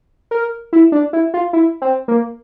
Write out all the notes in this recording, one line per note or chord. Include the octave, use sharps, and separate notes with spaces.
A#4
E4
D4
E4
F4
E4
C4
A#3